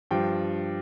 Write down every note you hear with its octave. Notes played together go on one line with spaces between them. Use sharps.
G2 F3 G5